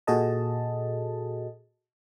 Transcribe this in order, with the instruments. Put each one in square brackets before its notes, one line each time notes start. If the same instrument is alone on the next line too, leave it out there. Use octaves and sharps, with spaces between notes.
[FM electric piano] A#2 F#4 G#4 A4 D#5 A5